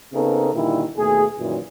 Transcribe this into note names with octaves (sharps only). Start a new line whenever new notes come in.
C#3 B3 C4 D#4 A4 A#4
A#2 D3 D#3 G3 E4
D#2 B2 A3 G#4
F#2 A#2 D#3 E3 F#3